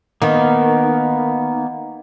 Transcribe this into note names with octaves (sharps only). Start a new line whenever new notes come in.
D#3 A#3 B3 D#4 D#5 F#5